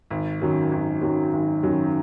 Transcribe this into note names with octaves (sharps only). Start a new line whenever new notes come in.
G#1
F#2 D#3 F#3
G#1
F#2 D#3 F#3
G#1
F#2 D#3 F#3